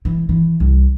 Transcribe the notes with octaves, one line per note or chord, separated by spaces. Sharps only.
E3
E3
C2